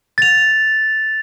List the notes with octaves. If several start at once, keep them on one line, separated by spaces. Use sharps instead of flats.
A6 F7